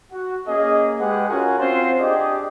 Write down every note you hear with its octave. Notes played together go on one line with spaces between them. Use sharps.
F#4
A#3 C#4 G#4 D#5
G#3 G4 G#4 B4 D#5 F#5
C#4 F4 F#4 A#4 F#5 G#5
C4 C#4 F4 F#4 C5
D4 G4 G#4 D5 D#5